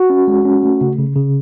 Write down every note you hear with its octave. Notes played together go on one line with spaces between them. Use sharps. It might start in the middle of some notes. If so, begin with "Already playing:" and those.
Already playing: F#4
C#4
G#3
C#4
A3
C#3
C#3
C#3